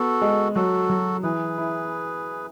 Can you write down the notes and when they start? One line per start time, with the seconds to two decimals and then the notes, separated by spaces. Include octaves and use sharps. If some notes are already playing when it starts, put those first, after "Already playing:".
Already playing: B3 F#4 A4
0.21 G#3
0.55 F#3 F#4 A4
0.89 F#3
1.23 E3 G#4 B4
1.58 E4